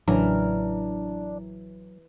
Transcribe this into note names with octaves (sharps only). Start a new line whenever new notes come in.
A1 C#3 E3 F#3 D4 A#4